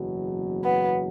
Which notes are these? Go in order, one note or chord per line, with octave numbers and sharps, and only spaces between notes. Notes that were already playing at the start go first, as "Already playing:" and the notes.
Already playing: F#1 E2 B2 F#3
B3